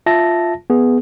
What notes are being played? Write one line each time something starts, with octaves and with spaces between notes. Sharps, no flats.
F4 E5 A5 A#6
B3 G#4